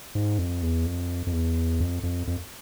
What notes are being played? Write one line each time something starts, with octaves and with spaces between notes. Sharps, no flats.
G#2
F2
E2
F2
F2
E2
F2
F2
F2